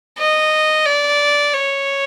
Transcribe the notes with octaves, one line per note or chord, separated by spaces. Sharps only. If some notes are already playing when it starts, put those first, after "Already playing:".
D#5
D5
C#5